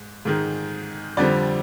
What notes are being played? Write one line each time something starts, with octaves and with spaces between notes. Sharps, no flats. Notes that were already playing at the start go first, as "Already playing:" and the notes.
Already playing: G#2
G#2 D#3 G#3
F2 D3 G3 C4 D5